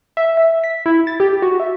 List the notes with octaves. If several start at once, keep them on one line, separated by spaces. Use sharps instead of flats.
E5
E5
B6
E4
A6
G4
F#4
E5